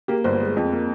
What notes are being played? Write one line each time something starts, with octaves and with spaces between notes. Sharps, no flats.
A#3 G4
G1 C5
G#3
F2
A#3